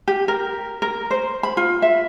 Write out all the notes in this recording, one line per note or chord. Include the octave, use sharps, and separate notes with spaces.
G4
A#4
A#4
C5
B5
F4
E5